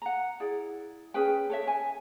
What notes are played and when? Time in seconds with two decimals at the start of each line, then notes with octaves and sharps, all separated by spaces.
0.02 F#5 A#5
0.40 E4 G#4 D5
1.14 C#4 G#4 B4 G5
1.50 A4 C#5 E5
1.67 G#5